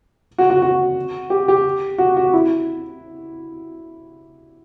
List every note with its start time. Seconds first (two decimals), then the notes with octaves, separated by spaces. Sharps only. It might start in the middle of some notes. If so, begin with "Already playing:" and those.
0.38 F#4
0.50 F#4
0.62 F#4
1.30 G4
1.48 G4
1.98 F#4
2.17 F#4
2.34 E4